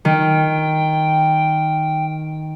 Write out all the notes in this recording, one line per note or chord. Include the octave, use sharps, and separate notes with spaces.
D#3 G5